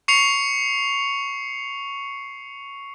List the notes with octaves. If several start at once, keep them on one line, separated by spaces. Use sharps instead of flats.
C#6 C7 C#7 F7